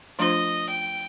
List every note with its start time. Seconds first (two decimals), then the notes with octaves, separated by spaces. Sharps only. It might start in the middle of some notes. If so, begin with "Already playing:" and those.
0.19 F3 A3 D4 F4 C5 D#5
0.69 G5